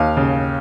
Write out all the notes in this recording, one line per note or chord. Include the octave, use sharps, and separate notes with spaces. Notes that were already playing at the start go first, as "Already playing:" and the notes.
Already playing: D#2 F5
C#3